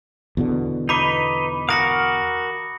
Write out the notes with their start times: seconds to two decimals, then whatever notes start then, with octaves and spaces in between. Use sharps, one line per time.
0.37 E2 B2 D3
0.89 D#4 B4 D#5 B5 D6
1.69 F#4 A#4 F5 D#6 A#6 C#7